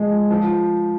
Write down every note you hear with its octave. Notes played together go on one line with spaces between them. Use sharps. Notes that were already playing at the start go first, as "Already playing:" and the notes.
Already playing: F3 G#3
F3